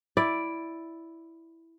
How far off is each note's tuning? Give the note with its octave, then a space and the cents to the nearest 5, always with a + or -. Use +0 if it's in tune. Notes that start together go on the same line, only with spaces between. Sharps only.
E4 +0 D5 +0